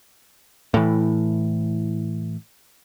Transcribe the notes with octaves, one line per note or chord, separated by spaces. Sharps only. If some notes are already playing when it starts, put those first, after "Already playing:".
A2 E3